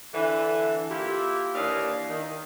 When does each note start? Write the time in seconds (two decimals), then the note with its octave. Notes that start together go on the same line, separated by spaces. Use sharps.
0.14 D3 E3
0.90 A#3 E4 F4 G4
1.55 D#2 E3 A#3 D4 D#5 F5
2.09 D#3